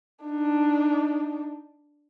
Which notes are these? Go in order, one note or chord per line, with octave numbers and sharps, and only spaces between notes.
D4 D#4